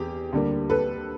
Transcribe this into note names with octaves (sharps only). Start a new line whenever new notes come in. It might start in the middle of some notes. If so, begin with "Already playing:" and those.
Already playing: E2 G4 G#4
D2 D3 G3 A#3
A4 B4